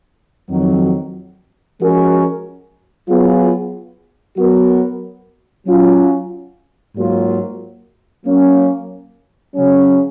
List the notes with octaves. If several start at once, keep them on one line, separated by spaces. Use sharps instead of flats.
F2 D#3 F#3
F3 G#3 C#4 F#4 A#4
F#3 B3 F4 G#4
F#3 B3 F#4 A#4
F#3 C#4 F4
G#2 F#3 A#3 F4
F#3 A#3 C#4
C#3 F#3 C#4